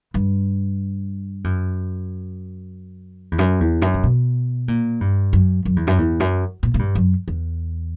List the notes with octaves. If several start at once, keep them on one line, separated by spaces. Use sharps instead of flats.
G2
F#2
E2
F#2
E2
F#2
C#3
B2
A#2
G2
F#2
F#2
E2
F#2
E2
F#2
A#2
A#2
G2
F#2
E2